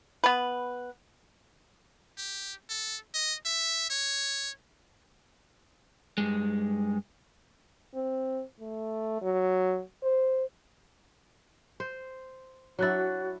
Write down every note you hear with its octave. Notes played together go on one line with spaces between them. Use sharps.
B3 B4
G4
A4
D#5
E5
C#5
G2 G#3
C4
A3
F#3
C5
C5
F#3 D4 E4 F#4 C#5 F#6 A6